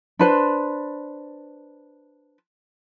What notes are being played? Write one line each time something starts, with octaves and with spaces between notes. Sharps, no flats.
D4 B4 C5